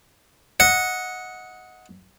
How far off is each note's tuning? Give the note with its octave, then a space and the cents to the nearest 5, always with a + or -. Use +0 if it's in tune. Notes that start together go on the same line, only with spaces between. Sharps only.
D#5 +20 F#5 -10